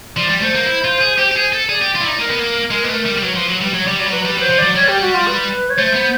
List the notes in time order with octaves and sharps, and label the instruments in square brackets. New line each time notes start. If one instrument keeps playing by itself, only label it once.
[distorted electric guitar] F3 [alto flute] D5
[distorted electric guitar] G3
[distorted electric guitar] A3 [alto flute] C5
[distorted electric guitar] A#3
E4
F4
G#4
G4
G4
G#4
A4
[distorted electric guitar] G#4 [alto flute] D5
[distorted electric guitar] G4
F4
E4
D#4
[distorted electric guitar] A#3 [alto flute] A#4
[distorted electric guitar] B3
A#3
[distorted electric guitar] G#3 [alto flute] A#4
[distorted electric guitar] A#3 [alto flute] B4
[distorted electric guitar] A3 [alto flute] A#4
[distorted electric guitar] G3
G3
[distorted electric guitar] F#3 [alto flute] B4
[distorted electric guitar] F3
F#3
G3
[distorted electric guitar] F#3 [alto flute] C#5
[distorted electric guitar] G3 [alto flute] D5
[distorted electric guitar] F#3 [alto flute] D5
[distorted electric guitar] G3
[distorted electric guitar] F#3 [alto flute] B4
[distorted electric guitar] G3 [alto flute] B4
[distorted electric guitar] F#3 [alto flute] C5
[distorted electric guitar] F3
[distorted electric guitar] F#3 [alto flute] D5
[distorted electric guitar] G3 [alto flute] C#5
[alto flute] G4
F#4
F4
B4
C#5
[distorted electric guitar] A3 [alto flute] C5
[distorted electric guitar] B3